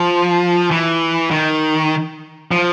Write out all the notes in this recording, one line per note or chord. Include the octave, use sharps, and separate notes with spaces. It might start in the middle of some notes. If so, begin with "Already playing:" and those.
Already playing: F3
E3
D#3
F3